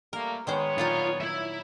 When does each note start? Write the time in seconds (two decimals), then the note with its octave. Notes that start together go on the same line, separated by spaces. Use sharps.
0.13 G3 A3 A#3 A#4
0.47 D#3 G#3 B3 C5 C#5
0.78 A#2 F#3 D#4 F4
1.21 E4 E5